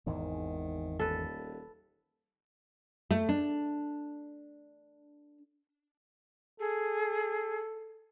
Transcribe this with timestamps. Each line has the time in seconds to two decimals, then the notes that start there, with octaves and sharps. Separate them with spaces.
0.06 G#1 E2 G#2 D#3
0.99 D#1 A4 B4
3.11 A3
3.29 D4
6.60 G#4 A4